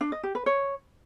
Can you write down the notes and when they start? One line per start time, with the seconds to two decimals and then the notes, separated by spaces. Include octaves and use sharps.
0.01 D4
0.12 D#5
0.23 G4
0.35 B4
0.46 C#5